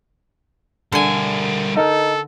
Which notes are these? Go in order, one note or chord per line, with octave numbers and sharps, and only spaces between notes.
D3 G3 A#4 G#5
D#4 A4 A#4